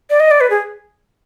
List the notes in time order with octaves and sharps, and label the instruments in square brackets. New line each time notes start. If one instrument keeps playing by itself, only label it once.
[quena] D5
D#5
D5
B4
G#4